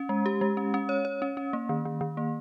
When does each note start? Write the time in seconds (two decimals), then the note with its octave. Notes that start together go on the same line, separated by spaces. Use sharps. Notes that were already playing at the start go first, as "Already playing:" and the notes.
Already playing: C#4
0.09 G#3
0.26 G4
0.41 G#3
0.57 C#4
0.74 C#4
0.89 C#5
1.05 C#5
1.22 C#4
1.37 C#4
1.53 A#3
1.69 D#3
1.85 D#3
2.01 D#3
2.17 A#3